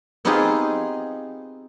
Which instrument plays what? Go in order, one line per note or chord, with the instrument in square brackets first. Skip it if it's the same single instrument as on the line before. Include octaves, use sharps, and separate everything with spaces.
[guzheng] B3 C4 D#4 F4 G4 G#4